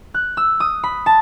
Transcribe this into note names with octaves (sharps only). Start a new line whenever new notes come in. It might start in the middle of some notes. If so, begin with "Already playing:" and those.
F#6
E6
D#6
B5
A5